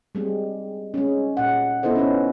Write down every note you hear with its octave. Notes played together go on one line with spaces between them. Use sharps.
G3 G#3 C4
G#3 C#4
A#2 F#5
B3 E4 A4 C5 D#5
C#4 D#4 B4